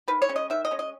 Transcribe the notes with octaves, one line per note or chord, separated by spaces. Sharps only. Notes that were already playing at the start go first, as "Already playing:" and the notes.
D#3 B4
C#5
G#3 C#4
D#5
D#3 E5
D#5
G#3 C#4
D#5